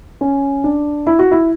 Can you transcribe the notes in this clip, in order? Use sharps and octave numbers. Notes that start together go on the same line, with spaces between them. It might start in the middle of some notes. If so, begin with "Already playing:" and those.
C#4
D4
E4
F#4
E4